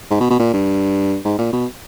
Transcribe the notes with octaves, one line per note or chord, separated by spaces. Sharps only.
G#2
B2
B2
A#2
G2
G#2
A#2
B2